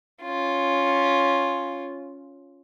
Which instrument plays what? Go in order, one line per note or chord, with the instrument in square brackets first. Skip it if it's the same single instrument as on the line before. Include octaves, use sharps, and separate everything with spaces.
[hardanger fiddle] C#4 F4